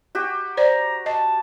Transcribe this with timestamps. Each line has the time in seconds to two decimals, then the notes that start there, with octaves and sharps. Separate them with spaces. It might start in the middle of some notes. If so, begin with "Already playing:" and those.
0.15 F#4 G4
0.57 C5 D5 A#5
1.06 D#5 A5